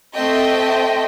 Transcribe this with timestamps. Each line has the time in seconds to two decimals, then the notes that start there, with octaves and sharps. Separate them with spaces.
0.14 A3 C4 D#5 E5 G5